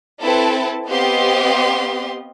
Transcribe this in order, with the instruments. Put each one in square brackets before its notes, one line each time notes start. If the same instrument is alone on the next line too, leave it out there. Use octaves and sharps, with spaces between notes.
[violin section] C4 E4 A4 B4 A5
B3 C4 G4 D#5 F5 C6